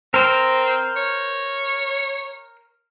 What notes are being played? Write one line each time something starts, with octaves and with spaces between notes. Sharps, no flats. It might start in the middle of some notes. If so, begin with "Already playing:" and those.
C4 A#4 C5
C#5